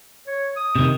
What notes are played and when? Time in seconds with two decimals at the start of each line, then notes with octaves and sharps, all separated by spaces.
0.27 C#5
0.56 D#6
0.76 C3 D#3